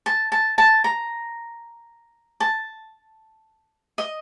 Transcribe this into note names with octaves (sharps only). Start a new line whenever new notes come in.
A5
A5
A5
A#5
A5
D#5